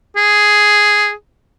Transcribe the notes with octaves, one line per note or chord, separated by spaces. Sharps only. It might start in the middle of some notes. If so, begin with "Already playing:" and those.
G#4